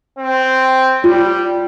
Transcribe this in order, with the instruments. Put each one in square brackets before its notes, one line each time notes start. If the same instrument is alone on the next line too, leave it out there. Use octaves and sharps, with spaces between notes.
[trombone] C4
[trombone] G3 [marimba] F4